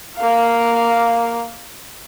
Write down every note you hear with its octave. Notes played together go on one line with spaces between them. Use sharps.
A#3 F5